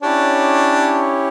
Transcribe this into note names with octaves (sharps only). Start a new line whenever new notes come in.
C#4 D4 E4 G4 C#5